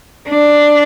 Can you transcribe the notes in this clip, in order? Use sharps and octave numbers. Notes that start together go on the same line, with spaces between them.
D4